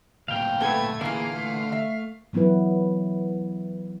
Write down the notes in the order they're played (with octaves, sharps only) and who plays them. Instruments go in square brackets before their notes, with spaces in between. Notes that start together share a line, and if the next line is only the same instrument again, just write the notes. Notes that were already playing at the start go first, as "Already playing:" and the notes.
[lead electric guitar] D2 A#2 [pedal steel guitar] F5 G5
[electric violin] A3 G#6 [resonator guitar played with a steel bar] B3 A4
[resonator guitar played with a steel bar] A#2 E3 G#5 [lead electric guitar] D3 [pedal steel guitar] A#3 G#4 [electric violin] F5
[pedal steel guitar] A3
[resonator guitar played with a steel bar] E5
[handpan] E3 F#3 B3 E4 B4